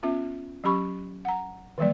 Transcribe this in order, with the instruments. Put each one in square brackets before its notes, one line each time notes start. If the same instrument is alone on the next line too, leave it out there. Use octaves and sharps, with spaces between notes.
[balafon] B3 C#4 F4 E5
F#3 C#4 G4 B5 C#6
F#5 A#5
D#3 E3 F#3 G3 A#3 D5